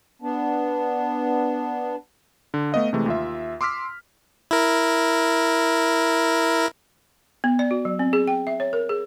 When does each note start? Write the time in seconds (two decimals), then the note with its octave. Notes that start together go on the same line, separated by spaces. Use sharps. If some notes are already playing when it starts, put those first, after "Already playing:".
0.22 B3 D4
2.54 D3
2.72 A3 B3 D#5 F5
2.93 C3 E3 G#3 A3
3.06 D#2 F4 E5
3.61 C6 D6 E6 F6 B6
4.51 E4 A#4
7.44 B3
7.59 D5
7.71 F#4
7.85 F#3
7.99 C4
8.13 G#4
8.27 G5
8.47 E5
8.60 C#5
8.73 A#4
8.89 G#4